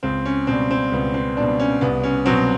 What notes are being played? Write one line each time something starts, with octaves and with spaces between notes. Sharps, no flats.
C#2 C4
C#4
B2 G3 C4
C4
C#2 B3
C4
B2 G3 D4
C#4
C2 B3
C#4
B2 F#3 C4